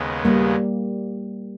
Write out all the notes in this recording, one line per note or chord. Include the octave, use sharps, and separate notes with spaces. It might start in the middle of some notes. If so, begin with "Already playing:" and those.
Already playing: D#2 C#3 G#3 B3
G3 A#3